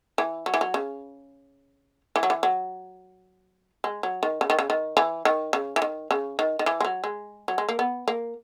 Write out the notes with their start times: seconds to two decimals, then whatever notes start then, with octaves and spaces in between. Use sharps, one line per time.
0.18 E3
0.46 F#3
0.54 E3
0.61 F#3
0.74 C#3
2.16 E3
2.23 F#3
2.30 E3
2.43 F#3
3.84 G#3
4.03 F#3
4.23 D#3
4.41 C#3
4.50 D#3
4.59 C#3
4.70 D#3
4.97 E3
5.25 D#3
5.53 C#3
5.76 E3
5.82 D#3
6.11 C#3
6.39 D#3
6.59 D#3
6.66 E3
6.80 G#3
6.85 F#3
7.04 G#3
7.48 F#3
7.58 G#3
7.69 A#3
7.79 B3
8.08 A#3